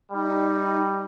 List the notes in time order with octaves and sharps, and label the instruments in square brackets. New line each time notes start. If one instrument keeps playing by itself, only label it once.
[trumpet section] G3 [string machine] D#4